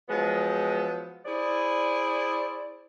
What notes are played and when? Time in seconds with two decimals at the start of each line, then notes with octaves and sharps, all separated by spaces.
0.09 F3 F#3 G#3 B3
1.25 E4 G#4 C5 D5